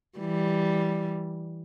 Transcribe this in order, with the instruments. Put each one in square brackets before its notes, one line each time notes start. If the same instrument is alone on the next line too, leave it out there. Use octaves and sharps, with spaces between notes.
[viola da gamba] E3 G3